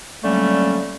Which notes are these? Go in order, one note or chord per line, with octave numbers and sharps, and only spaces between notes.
D3 F#3 G3 A3 A#3 C#4